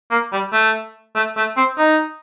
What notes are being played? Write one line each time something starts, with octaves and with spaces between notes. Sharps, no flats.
A#3
G3
A3
A3
A3
C4
D#4